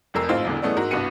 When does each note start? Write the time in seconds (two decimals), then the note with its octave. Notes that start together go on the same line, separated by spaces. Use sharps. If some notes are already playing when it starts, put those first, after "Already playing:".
0.14 F1 F2 A3 A#4 E6 C7
0.29 A1 G#2 C4 F4
0.45 E1 E2 D3
0.62 E3 G#3 A3 B3 C#4 D4
0.77 G#2 F#4 A#4
0.91 C2 G2 B3 F#4 C#7 D#7